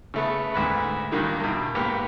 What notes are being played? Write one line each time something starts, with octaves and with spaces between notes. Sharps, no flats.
C#3 A3 B3
D2 G#2 B4
A#2 D3 D#3 G3 A#3
E2 B2
G#2 A#3 B3 G4 A#4